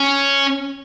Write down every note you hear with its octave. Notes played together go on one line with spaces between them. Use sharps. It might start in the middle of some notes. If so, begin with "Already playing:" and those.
Already playing: C#4